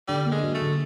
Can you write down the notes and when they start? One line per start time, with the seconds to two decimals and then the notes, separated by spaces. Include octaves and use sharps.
0.08 D3 G3
0.26 A#3
0.32 G#3
0.43 F#3
0.55 A3
0.61 D3